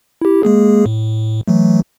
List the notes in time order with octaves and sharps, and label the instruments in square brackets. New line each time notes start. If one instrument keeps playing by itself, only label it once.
[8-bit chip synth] E4 G4
G#3 A#3 G#4
A2
E3 F#3 A3